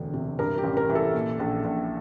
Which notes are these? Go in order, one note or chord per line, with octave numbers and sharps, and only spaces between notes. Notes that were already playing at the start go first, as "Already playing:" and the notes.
Already playing: E1 D2
C3
G2 A#4
G4
A1
A#4
E3
A4
A#2
A#1
A#1